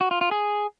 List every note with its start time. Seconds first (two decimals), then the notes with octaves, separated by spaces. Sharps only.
0.01 F#4
0.11 F4
0.21 F4
0.31 G#4